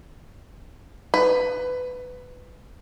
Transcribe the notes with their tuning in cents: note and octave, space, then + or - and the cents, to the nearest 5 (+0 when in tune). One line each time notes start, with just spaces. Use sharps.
B4 +15